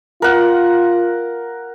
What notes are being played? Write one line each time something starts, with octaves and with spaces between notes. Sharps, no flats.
F4 A#4 F#5